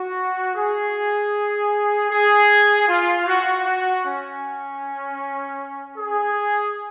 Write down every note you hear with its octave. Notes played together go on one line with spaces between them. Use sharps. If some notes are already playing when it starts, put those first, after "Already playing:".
Already playing: F#4
G#4
G#4
F4
F#4
F#4
C#4
G#4